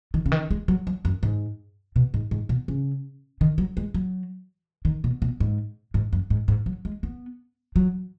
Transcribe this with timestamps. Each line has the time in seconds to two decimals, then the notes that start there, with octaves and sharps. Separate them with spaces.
0.14 D#3
0.26 C#3
0.32 D#3
0.51 G#3
0.68 F#3
0.87 F#3
1.05 F#2
1.23 G#2
1.96 B2
2.14 G#2
2.31 G#2
2.49 B2
2.68 C#3
3.41 D#3
3.58 F#3
3.77 G#3
3.94 F#3
4.85 D#3
5.04 B2
5.22 B2
5.40 G#2
5.94 G#2
6.13 F#2
6.30 G#2
6.48 G#2
6.66 F#3
6.85 G#3
7.03 B3
7.76 F#3